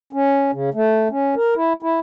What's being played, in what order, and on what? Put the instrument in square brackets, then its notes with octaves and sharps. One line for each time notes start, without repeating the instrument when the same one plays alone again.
[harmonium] C#4
C#3
A3
C#4
A#4
E4
E4